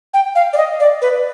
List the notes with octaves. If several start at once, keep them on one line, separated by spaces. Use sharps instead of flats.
G5
F5
D5
D#5
D5
B4